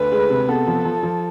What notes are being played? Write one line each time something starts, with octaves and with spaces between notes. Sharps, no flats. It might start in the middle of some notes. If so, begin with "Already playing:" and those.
Already playing: D2 B4
G#3
C3
B3 A4
F3
F3
F3